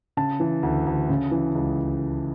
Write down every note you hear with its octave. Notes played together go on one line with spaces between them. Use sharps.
C#3 A5
E3
D2
D2
C#3
E3
C#2